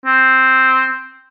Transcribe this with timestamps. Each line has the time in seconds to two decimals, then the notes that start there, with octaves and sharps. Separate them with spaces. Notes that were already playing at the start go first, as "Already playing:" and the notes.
0.06 C4